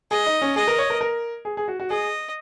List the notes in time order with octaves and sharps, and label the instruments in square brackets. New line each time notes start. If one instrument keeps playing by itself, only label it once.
[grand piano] G#4 [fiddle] D#5
[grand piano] D#4
C#4
[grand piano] G#4 [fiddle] D#5
[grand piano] A#4
C#5
A#4
A#4
G#4
G#4
F#4
F#4
[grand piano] G#4 [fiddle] D#5